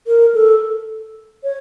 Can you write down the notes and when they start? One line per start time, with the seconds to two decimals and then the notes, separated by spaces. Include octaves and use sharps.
0.07 A#4
0.34 A4
1.44 C#5